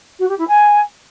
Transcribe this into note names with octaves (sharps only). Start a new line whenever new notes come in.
F#4
G4
E4
G#5